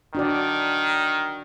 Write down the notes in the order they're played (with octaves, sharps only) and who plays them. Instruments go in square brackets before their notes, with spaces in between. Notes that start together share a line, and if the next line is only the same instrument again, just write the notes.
[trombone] D#3 [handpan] D4 F#4 D5